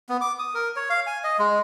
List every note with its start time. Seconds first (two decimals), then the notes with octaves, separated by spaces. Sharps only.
0.09 B3
0.21 D6
0.39 D#6
0.55 A#4
0.76 C#5
0.90 F5
1.07 G#5
1.24 D#5
1.39 G#3